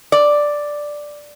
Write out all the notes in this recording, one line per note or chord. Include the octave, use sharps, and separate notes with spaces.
D5